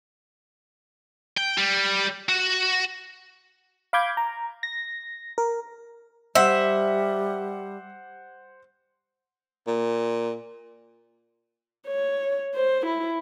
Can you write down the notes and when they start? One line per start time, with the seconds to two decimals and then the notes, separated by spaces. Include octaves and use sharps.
1.38 G5
1.58 G3
2.29 F#4
3.93 F5 B5 D6 G6 G#6
4.17 A#5
4.63 A#6
5.38 A#4
6.35 G3 C5 E5 F#5
9.67 A#2
11.87 C#5
12.54 C5
12.86 E4